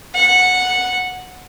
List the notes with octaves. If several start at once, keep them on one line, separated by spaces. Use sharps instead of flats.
F#5